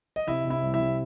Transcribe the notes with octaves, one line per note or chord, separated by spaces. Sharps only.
D#5
C3 E4 E5
C3
E4 E5
C2
E4 E5
C3